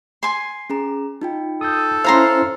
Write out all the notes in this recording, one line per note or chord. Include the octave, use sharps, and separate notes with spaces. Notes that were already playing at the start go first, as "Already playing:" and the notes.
G#5 C6
C#4 G#4 A#5
D#4 F4 G5
A4 D#6 G6
C#4 E4 C5 F5 A#5 C6 F6